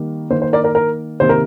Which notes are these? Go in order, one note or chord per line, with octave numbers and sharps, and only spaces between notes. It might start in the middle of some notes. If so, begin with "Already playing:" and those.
Already playing: D#3 G3 A#3
D#3 A#3 C5
C5
A#4 D5
A#4 D5
A#4
C3 D#3 A#3 C5
A#4